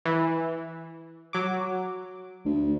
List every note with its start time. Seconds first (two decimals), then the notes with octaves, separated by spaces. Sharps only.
0.05 E3
1.33 F#3 D6
2.45 D2